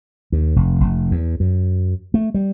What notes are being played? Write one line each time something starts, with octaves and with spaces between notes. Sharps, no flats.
D#2
F1
F1
E2
F#2
A3
G3